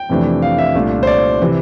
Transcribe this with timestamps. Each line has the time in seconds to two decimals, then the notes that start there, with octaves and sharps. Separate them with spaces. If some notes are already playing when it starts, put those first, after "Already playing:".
Already playing: G5
0.09 F2 C3 E3 A3 D4
0.42 F5
0.58 E5
0.75 C2 A#2 A3 D4 F4
1.03 C5
1.07 D5
1.42 C3 E3